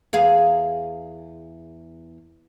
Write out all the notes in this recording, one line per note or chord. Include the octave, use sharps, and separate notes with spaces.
E2 G#4 F5